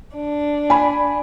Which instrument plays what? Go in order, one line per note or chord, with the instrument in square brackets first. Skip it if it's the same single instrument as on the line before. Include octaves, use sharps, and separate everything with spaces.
[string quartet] D4
[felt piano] G#5 B5